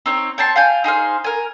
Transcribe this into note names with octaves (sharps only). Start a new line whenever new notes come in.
C4 D#4 C#5
C#5 G5 A5 C6
F5 G5 G#5 G6
D#4 G#4 C5 F5
A#4 G#5